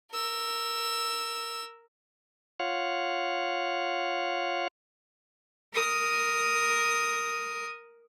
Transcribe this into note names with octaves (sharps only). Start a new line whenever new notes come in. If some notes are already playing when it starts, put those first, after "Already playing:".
A#4 E6
F4 C#5 F5 F#5
A#4 D#6